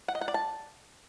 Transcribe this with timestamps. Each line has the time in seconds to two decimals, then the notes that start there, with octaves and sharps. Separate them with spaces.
0.08 F#5
0.15 D#5
0.21 F#5
0.28 D5
0.34 A5